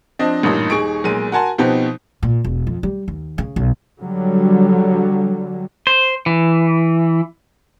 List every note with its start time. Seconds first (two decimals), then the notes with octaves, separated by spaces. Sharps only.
0.19 F3 C4 D4 D#5
0.43 A1 G2 A#2 D#4 D#5
0.70 D#1 D#4 G#4 C#6 D7
1.04 B1 A#2 G#3 D#7
1.32 F#4 A#4 F#5 G#5 A5 C6
1.58 B2 F3 B3 C4 D#4 G4
2.23 A#2
2.44 E1
2.67 F2
2.83 G3
3.08 D#2
3.38 C#3
3.56 B1
4.00 D3 F#3 G3
5.87 C5
6.26 E3